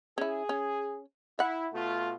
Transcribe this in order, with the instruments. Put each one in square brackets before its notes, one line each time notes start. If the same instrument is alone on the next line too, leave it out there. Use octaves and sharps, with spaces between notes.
[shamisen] C#4 E4 [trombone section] G#4
[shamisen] C#4
[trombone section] E4 [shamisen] E5 F#5
[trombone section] B2 A3 F4